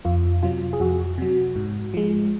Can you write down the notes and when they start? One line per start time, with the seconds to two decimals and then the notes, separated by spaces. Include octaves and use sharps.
0.05 F2 F4
0.43 C3 F#3 F4
0.73 G#4
0.80 F2 F#4
1.18 C3 F#3
1.56 G#2
1.94 F3 G#3